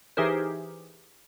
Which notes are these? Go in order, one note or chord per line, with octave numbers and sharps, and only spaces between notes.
E3 D#4 G4 G#4 A#4 C5